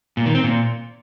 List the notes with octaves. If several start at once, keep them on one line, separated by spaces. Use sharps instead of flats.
A#2
D#3
C4
A#2